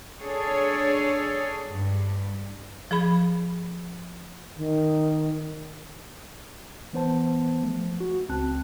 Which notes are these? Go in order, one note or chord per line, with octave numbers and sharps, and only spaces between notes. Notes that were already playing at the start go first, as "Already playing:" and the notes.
D4 G#4 A4 C#5
G2
F3 G#4 B5
D#3
E3 B3 C5 A5
F3 A3
F#4
C#2 C4 A5 F#6